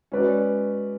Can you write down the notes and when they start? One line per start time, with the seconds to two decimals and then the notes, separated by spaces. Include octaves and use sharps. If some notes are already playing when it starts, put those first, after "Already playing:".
0.12 G#3 C#4 F#4 B4 D5